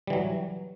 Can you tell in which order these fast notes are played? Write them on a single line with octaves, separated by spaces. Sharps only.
G3 E3 F#3